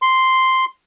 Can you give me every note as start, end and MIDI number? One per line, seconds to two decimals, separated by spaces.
0.02 0.65 84